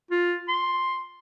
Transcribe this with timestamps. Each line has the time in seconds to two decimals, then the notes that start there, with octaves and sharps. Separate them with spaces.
0.11 F4
0.48 C6